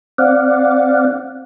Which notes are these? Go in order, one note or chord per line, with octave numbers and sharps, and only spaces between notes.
C4 D5 F5 F#5